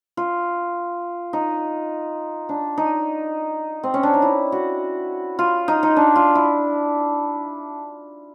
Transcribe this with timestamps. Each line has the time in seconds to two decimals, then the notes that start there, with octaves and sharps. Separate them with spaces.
0.17 F4
1.33 D#4
2.49 D4
2.77 D#4
3.83 C4
3.94 C#4
4.03 D4
4.14 D#4
4.22 E4
4.52 F#4
5.39 F4
5.68 D#4
5.83 D#4
5.96 D4
6.16 F4
6.35 E4